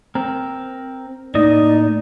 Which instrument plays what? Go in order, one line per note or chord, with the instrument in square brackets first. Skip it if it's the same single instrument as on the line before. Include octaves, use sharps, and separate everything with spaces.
[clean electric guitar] C4 A#4
[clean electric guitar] A2 A#3 D#5 [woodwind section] D#4 [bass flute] D5